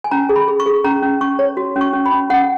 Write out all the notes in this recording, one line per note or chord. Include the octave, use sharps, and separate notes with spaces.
G#5
C#4 A#5
G#4
B5
G#4
C#6
G#4
C#4 A#5
C#4
C#4 C#6
C#5
F#4
C#4
C#6
C#4
B5
C#4
C#4 F#5